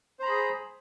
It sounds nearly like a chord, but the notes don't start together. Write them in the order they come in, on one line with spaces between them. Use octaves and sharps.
C5 A#5 B5 G#4